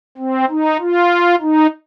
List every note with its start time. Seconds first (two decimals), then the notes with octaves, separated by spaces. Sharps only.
0.18 C4
0.50 D#4
0.80 F4
1.42 D#4